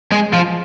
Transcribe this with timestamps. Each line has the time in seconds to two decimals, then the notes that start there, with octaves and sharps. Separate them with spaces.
0.12 G#3 G#4
0.33 F3 F4